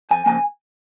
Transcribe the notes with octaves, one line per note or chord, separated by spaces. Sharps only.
F2 G#5
C#3 F3 A#3 G#5